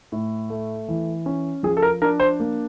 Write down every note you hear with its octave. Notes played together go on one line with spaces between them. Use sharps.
A2
A3
E3
C#4
F3 G#4
A4
A#4
D4 A#4
C5
A#3